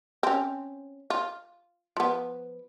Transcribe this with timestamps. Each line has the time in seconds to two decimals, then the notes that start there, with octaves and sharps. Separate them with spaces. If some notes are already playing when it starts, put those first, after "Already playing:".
0.23 C4 C#4
1.10 F4
1.97 F3 B3